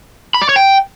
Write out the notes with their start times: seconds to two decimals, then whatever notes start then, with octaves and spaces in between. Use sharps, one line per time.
0.34 B5
0.42 D5
0.49 C#5
0.56 G5